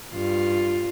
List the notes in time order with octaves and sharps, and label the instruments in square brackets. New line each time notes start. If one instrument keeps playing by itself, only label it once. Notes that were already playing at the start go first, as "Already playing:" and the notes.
[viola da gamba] G2 F4